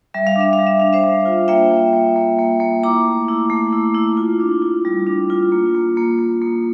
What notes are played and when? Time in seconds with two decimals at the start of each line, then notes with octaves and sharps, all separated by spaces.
0.14 G3 E5
0.27 F5
0.36 D4 E5
0.53 F5
0.59 G3
0.67 E5
0.80 D4 F5
0.93 C5 E5
1.04 G3
1.25 F4
1.48 A#3 E5 G5
1.71 A#3
1.93 A#3
2.16 A#3
2.38 A#3
2.60 A#3
2.84 E4 A#5 D6
3.05 A3
3.28 E4
3.50 A3
3.73 E4
3.95 E4
4.17 F4
4.40 D4
4.62 F4
4.85 G3
5.07 D4
5.30 F4
5.52 A#3
5.75 A#3
5.97 A#3
6.19 A#3
6.42 A#3